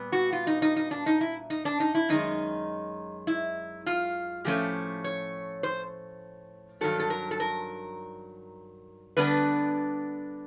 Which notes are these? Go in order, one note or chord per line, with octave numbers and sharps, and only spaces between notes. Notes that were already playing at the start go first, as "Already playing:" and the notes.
Already playing: A#2 G3 B3
F#4
F4
D#4
D#4
D#4
D4
D#4
E4
D#4
D4
D#4
E4
F#2 D#3 G#3 D#4
E4
F4
A2 F3 A3 C#4 G4
C#5
C5
G2 D#3 F#3 A4
A4
A#4
A4
A#4
D3 G3 B3 D4 B4